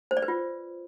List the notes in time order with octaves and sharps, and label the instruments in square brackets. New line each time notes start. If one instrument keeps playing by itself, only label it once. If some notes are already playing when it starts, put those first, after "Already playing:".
[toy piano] C5
D5
B4
F4